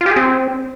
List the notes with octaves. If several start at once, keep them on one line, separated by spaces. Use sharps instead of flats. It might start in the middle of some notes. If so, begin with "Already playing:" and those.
F4
G4
G#4
C4